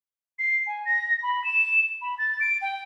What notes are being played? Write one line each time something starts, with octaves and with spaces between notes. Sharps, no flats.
C7
G#5
A#6
B5
E7
B5
A6
D7
G5